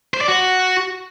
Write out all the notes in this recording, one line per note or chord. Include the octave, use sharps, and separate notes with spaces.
C5
D5
F#4